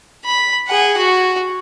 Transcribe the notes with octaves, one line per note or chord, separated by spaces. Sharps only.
B5
G#4 F#5
F#4